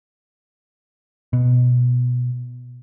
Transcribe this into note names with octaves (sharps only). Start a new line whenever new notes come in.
B2